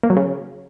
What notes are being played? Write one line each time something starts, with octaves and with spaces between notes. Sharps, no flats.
A#3
F#3
C#3